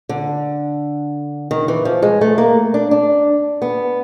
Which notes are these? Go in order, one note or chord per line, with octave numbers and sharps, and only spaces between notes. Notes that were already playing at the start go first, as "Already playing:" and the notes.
D3
D#3
E3
F3
G#3
A3
A#3
D4
D4
B3